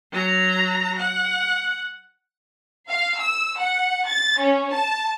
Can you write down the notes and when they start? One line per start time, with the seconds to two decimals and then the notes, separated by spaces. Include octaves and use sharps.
0.12 F#3 A#5
0.99 F#5
2.90 F5
3.20 E6
3.59 F#5
4.07 A6
4.40 C#4
4.72 A5